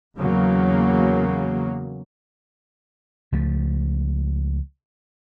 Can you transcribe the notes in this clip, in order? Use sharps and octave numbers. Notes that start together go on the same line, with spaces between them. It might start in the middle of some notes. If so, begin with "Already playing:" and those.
E2 C#3 F#3 A#3
C#2 F3 A3